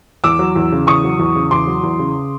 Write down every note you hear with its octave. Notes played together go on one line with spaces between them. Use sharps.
E2 D6 E6
F#3
E2
C#3
E2 C#6 D#6
F#3
E2
C#3
E2 C6 D6
F#3
E2
C#3